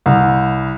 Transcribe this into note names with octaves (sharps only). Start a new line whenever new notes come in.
C2